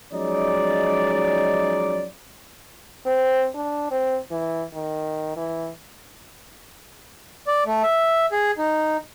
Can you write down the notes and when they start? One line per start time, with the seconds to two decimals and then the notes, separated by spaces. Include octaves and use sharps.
0.12 F3 F#3 G#3 C#4 D#4 D5
3.06 C4
3.55 D4
3.91 C4
4.31 E3
4.74 D#3
5.37 E3
7.47 D5
7.66 A3
7.83 E5
8.32 G#4
8.58 D#4